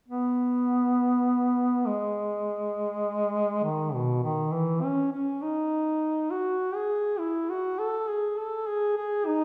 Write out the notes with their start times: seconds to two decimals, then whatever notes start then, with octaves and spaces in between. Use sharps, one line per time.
0.09 B3
1.86 G#3
3.64 D#3
3.94 B2
4.23 D#3
4.53 E3
4.83 C#4
5.13 C#4
5.42 D#4
6.31 F#4
6.75 G#4
7.19 E4
7.50 F#4
7.79 A4
8.09 G#4
8.39 A4
8.67 G#4
8.97 G#4
9.27 D#4